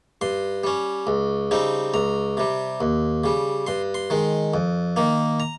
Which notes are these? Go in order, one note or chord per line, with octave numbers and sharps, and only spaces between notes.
G2 C6
G3 C#4
C#2
C#3 G3 C4 D#4
C#2 A#5
C3 G3
D#2
C#3 G3
G2 C6
C6
D#3 G#3
F2
D#3 A#3
A#5